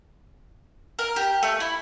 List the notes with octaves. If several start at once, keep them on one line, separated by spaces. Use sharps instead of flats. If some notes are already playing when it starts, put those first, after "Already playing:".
A#4
G4
A3
E4